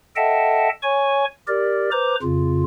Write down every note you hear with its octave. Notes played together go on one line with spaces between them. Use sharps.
A4 D#5 E5 F#5 G5 A5
C#5 G#5 C#6
G4 A#4 D5
B4 C5 A#5 D6
F2 C#3 F4